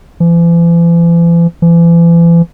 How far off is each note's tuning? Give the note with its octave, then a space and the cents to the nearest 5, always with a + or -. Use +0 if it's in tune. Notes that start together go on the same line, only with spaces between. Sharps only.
E3 +45
E3 +40